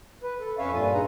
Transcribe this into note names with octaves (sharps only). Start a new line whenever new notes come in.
B4
A4
F2 C#4 B4 C#5 E5 F5
G2 A#2 F4 A4 G#5
D2 C#3 D#4 G#4 B4 A#5